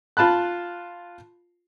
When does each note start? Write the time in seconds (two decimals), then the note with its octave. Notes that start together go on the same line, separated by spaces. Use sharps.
0.17 F4 A5 B5 F#6